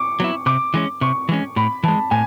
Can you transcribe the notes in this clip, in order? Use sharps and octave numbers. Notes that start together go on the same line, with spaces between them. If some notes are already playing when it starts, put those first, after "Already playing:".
Already playing: C#6 D6
F#3 B3 E4
C3 D6
E3 G#3 C#4
C3 C#6
E3 G#3 C#4
A2 B5
E3 G#3 A5
A2 G#5